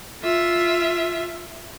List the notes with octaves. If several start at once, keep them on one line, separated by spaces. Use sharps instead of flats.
F4 E5